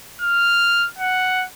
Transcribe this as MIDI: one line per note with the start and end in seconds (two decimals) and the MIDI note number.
0.21 0.88 89
0.99 1.46 78